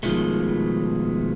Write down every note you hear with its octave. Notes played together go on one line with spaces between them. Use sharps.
B2 D#3 F3 G#3 A3